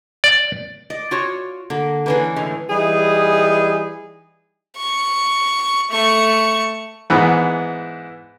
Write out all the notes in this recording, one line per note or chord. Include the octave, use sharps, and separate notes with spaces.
D5
D5 D#5
F4 F#4 C#5
D3 A#3
E3 A#3 C#4 D4 G#4 B4
A2 D3 G#3
E3 G3 D#4 G#4
C#6
A3 C#6
G#2 E3 B3